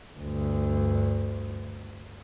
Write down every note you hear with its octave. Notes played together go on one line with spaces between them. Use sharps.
D2 G2